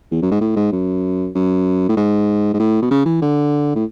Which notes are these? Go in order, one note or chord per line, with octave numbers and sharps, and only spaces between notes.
E2
F#2
G#2
A2
G#2
F#2
F#2
A2
G#2
G#2
A2
B2
C#3
E3
D3
A2